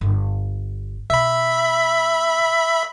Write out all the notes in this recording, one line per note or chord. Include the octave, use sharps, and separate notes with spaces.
G1
B2 E5 B5